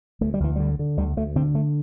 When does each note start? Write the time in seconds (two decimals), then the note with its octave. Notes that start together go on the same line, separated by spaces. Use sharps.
0.21 D2 A3
0.34 G3
0.40 D2 E3
0.56 D3 G3
0.79 D3
0.97 D2 G3
1.17 D2 A3
1.36 D3 C4
1.54 D3 A3